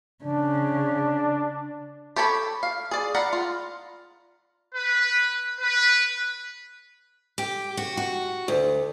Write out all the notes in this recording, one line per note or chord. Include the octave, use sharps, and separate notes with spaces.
C#3 D4
G4 A4 C#5 A#5 B5
F5
G#4 D5
D5 F5 F#5 A#5 B5
F4
B4
B4
G4
F#4
F#4
D2